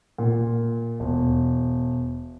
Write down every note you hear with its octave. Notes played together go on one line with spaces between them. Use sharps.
A#2
E1